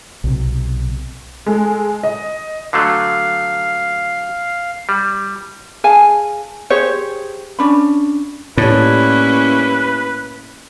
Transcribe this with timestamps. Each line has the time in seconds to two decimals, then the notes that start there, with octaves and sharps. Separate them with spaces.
0.24 B1 C3
1.46 G#3 A4
2.03 D#5
2.73 D3 F#3 A3 F5
4.89 G3
5.84 G#4 F5 G#5 A5
6.70 G4 G#4 C5 C#5
7.59 C#4 D4 B5
8.57 A2 G3 A#3 C#4 D#4 E4 B4 C#5